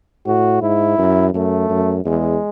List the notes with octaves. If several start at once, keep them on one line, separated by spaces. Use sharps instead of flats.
A2 F#4
G#2 E4
F#2
F#2 A3
F#2
E2 G#3